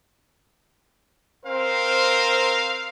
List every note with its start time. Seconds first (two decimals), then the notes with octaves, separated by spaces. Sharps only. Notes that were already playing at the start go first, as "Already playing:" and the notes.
1.46 C4 A#4 C5 F5